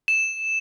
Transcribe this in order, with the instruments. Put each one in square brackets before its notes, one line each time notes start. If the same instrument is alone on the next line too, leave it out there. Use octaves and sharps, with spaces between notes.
[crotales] E7